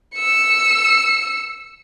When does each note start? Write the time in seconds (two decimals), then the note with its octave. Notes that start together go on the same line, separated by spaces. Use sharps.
0.15 E6 C#7